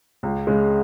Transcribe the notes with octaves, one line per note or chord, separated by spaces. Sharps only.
C#2
C#3 G#3